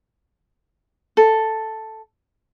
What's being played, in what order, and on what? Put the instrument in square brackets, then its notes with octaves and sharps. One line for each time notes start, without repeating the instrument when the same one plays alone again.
[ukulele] A4